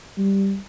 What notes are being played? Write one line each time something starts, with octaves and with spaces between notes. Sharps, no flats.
G3